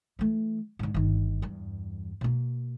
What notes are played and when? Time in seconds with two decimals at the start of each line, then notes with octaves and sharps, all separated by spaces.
0.19 E3 A3
0.79 G#2 D3
0.94 G1 D#3
1.42 E2 G2
2.21 B2 A#3